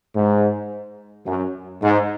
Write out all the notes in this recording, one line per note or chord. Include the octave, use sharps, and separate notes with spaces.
G#2
F#2
G#2